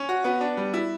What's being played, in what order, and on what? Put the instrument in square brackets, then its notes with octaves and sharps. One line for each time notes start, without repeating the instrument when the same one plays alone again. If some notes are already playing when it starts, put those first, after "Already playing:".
Already playing: [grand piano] C#4
F#4
B3
D4
G3
E4